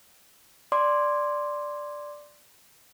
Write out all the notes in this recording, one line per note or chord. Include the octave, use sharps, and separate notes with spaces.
D5 C6 D6